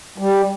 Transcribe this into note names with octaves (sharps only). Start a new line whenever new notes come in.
G3